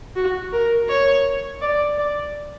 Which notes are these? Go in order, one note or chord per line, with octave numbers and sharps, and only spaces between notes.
F#4
A#4
C#5
D5
D5